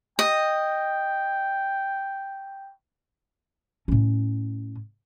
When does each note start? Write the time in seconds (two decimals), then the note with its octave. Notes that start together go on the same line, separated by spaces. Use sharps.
0.19 D#5 G5
3.88 A2 C#4